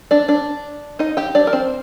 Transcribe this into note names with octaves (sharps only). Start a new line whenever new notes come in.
D4 D5
D4 D5
D#4 D#5
G4 G5
D4 D5
A#4
C4 C5